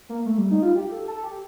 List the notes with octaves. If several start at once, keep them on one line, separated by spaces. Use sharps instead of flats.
A#3
A3
G3
D#4
F4
G4
A4
A4
G4